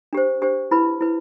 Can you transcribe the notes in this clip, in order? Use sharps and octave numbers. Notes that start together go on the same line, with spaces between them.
D4 G4 C5
D4 G4 C5
E4 B4 B5
E4 B4